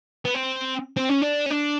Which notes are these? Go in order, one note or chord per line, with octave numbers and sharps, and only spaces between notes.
B3
C4
C4
C#4
D4
C#4
D4